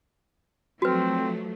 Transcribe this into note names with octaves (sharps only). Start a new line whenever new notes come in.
F3 F#3 A3 C4 F#4 B4